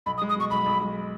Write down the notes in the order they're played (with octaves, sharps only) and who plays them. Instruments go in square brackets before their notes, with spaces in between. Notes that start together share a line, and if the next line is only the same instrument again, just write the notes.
[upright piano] B1 [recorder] B5
[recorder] D#6
[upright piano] G#3
[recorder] D#6
[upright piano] B2 [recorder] C#6
[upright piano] B1 [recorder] B5
[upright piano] B1
G#3